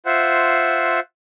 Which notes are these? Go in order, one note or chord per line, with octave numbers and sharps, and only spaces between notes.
F4 C5 E5 F#5